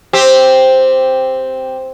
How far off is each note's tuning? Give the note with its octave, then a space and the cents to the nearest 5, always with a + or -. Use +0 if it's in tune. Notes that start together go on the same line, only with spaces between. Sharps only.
C4 +0 G4 +0